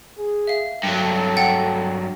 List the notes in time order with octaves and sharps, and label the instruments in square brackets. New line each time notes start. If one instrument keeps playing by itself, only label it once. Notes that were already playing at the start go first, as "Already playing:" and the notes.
[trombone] G#4
[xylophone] E5 F5
[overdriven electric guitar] G2 F#3 [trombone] A4
[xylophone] F#5 G5 A6